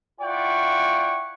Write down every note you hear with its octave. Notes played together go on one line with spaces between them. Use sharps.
E4 F4 D5 F#5 G5 C#6